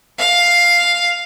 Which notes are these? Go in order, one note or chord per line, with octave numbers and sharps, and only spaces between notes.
F5